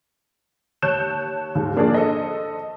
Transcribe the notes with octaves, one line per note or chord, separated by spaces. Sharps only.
D#2 C#5 A5 F#6 G6 E7
D#2 G#2
F3 A#3 D4 F4 G#4 D5
A4 C5 D#5